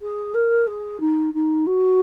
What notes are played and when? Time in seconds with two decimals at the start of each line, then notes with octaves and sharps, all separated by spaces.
0.02 G#4
0.34 A#4
0.67 G#4
1.00 D#4
1.34 D#4
1.66 F#4